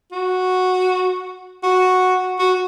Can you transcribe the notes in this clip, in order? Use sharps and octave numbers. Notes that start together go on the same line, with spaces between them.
F#4
F#4
F#4